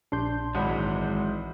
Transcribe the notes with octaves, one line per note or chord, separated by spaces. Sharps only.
A#1 D4 C6 G6
G#1 E3 F#3 G#3 F#5 B5